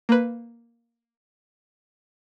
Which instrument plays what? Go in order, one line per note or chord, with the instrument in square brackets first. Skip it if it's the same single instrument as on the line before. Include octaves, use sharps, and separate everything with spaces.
[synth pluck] A#3 B4